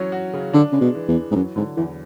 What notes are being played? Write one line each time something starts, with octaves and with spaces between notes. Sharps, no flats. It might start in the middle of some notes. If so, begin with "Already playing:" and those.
Already playing: E3 F#3 C#4
F#4
C#3
D3 D4
C#3 G#3
B2
E3
E2
E3
G#2
F#2 F#3
G#2 D3
E2 E3